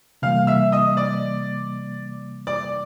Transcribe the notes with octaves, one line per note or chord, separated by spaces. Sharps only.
C3 E3 G3 A#3 F5 F6
E5 E6
D#5 D#6
D5 D6
D5 D6